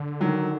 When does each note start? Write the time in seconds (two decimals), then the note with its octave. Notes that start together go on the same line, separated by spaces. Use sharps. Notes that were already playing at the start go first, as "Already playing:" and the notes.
Already playing: D3
0.20 D#3 F#3